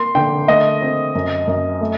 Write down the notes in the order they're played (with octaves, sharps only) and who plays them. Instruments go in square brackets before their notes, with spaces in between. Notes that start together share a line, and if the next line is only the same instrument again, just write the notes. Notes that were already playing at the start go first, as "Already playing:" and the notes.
Already playing: [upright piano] A#3 C6
D3 G5
A3 D#5
C4
F#2
F#2
A3